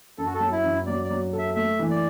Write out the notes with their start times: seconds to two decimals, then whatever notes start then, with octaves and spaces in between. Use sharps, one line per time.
0.18 F#2 A4
0.26 F#4
0.34 A4
0.40 F#3
0.52 E4
0.64 F#2
0.86 F#3 D5
1.04 D5
1.10 F#3
1.33 A4
1.38 E5
1.55 A3 E5
1.79 E3
1.90 D5